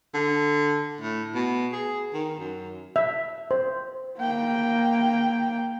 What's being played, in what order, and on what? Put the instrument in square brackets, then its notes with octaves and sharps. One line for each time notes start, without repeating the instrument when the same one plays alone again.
[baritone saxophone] D3
A2
B2
G#4
D#3
F#2
[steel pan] E5
C5
[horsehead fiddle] A#3 G5